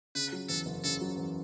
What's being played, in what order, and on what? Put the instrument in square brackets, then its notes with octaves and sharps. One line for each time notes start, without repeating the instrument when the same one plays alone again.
[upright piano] C#3 [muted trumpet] B4
[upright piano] F#3
[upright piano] E2 [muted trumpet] A4
[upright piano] F#1
[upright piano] C#3 [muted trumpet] A4
[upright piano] F#3
E2